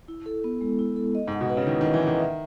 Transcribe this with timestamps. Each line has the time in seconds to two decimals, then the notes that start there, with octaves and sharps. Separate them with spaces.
0.08 E4
0.26 A4
0.44 B3
0.61 G#3
0.79 E4
0.96 A4
1.15 D#5
1.28 G#2
1.32 F#5
1.41 B2
1.49 B4
1.57 C#3
1.67 D#3 E4
1.81 D#3
1.85 D#5
1.94 E3
2.03 D#3 F#5
2.20 E5